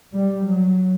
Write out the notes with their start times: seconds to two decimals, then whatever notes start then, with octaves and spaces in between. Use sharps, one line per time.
0.14 G3
0.45 F#3